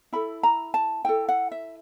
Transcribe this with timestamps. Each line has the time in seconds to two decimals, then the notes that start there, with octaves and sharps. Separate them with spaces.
0.13 E4 A4 B5
0.43 A#5
0.74 A5
1.05 E4 A4 G5
1.29 F#5
1.52 E5